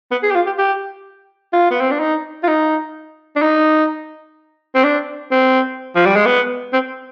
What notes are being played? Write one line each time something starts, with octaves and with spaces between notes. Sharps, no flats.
B3
G#4
G4
F4
G4
G4
F4
B3
C4
D4
D#4
F4
D#4
D4
D#4
C4
D4
C4
F3
G3
G#3
B3
C4